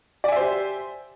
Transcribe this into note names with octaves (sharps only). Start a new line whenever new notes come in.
G4 C5 D5 E5 G#5